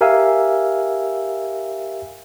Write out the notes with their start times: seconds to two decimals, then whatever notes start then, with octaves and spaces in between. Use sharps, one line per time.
0.01 G4 A#4 E5 F5 G#5 E6